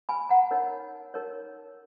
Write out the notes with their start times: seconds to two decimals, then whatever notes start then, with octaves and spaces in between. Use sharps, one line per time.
0.09 G#5 B5
0.29 F#5 A#5
0.51 D#4 A#4 C#5
1.14 D#4 A#4 C#5